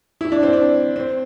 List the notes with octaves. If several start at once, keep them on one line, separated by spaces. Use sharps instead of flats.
E4
D4
C4
D4
C4